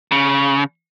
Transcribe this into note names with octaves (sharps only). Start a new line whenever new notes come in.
C#3